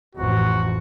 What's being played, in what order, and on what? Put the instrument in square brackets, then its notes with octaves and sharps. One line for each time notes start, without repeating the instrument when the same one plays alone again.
[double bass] A1 F2 [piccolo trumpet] F#4